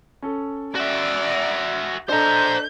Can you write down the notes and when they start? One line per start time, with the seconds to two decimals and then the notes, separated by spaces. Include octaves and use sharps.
0.22 C#4 A4
0.75 F#4 D5 E5
2.09 D4 A4 C5 D#5 A#5 G6